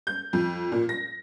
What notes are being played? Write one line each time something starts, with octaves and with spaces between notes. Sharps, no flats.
G6
F2
A#2
A#6